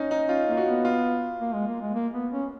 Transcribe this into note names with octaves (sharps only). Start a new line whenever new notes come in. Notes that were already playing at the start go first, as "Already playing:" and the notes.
Already playing: C#4 D#4
D#4
C#4 F4
A#3 F4
F#4
B3
F4
A#3
G#3
A#3
G#3
A#3
B3
C#4